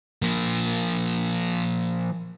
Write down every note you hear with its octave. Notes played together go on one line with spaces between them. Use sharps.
F3 A#3